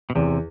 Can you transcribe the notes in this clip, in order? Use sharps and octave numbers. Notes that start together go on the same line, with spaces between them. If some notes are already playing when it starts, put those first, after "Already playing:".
B2
E2 C3